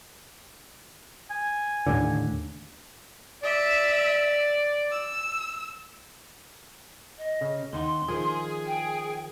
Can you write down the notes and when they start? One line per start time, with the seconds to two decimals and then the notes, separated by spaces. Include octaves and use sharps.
1.30 G#5
1.86 D#2 A2 D3
3.43 D5 E5
4.91 E6
7.18 D#5
7.41 C#3
7.73 D#2 D#4 F#5 C6
8.08 D#3 F3 G#4
8.66 G5